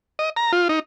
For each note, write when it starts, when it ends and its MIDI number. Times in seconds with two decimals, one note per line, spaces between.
0.19 0.30 75
0.37 0.52 82
0.53 0.68 65
0.69 0.80 63